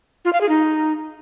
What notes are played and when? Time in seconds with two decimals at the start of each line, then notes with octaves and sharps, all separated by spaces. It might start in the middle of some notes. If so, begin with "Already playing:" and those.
0.25 F4
0.33 F5
0.41 G#4
0.49 D#4